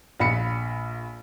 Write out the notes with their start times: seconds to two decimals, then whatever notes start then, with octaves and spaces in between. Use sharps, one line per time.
0.20 A#1 F5 B5 C#7